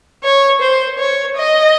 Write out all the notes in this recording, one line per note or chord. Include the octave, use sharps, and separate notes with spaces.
C#5
C5
C#5
D#5